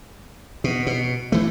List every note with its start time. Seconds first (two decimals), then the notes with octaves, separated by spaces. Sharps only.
0.64 B2
0.87 B2
1.32 E3 A3